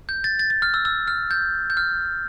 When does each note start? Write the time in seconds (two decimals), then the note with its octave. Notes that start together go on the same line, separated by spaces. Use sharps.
0.09 G6
0.24 A6
0.39 A6
0.50 A6
0.62 F6
0.74 E6
0.85 E6
1.08 F6
1.31 G6
1.70 G6
1.77 F6